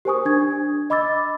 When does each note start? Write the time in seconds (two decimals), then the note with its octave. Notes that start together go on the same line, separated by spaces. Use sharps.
0.05 G4 A#4 C5 G#5 C#6 D#6
0.25 D4 G#6
0.90 D#5 B5 D6 E6 A6